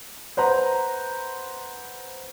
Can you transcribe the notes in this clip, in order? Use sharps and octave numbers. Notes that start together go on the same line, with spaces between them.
B4 C5 F#5 A#5